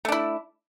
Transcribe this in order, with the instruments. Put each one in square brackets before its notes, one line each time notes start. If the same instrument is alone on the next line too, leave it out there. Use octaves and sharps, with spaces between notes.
[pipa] A3
D4
E4